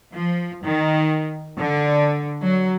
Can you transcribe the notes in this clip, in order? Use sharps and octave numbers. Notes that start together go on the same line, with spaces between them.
F3
D#3
D3
F#3